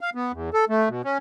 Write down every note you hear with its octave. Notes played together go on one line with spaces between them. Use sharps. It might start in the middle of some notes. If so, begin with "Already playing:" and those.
F5
B3
E2
A4
A3
B2
C#4